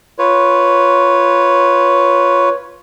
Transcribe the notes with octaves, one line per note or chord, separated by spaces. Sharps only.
F4 B4 C#5